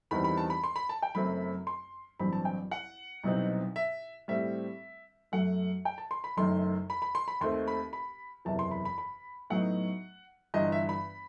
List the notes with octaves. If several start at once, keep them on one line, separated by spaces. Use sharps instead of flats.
E2 D#3 G3 C4 B5
B5
A5
B5
C6
B5
A5
G5
F#1 F#2 F#3 A3 C4 B5
C6
A1 G2 F#3 C4 B5
A5
G5
F#5
C2 B2 F#3 C4 D#4
E5
A2 G3 C4 E5
F#2 F#3 A3 F#5
G5
A5
C6
B5
F#1 F#2 D#3 A3 C6
B5
B5
C6
B5
D#2 D#3 A3 C4 C6
B5
B5
F#1 E2 C3 E3 A5
C6
B5
B5
B5
A2 F#3 B3 D#4 F#5
G1 G2 E3 D#5
E5
B5